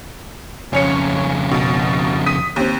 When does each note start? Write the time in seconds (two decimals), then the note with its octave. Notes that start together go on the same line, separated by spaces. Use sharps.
0.73 F2 C#3 C#4 C#5 C#7
1.51 B2
2.26 D#6 B6 D#7
2.56 D#2 C4